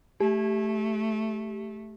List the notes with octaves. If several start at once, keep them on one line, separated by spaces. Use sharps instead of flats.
A3 G4